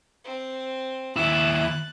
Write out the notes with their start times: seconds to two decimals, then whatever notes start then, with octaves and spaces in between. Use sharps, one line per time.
0.24 C4
1.16 D#2 E4 F#6 A6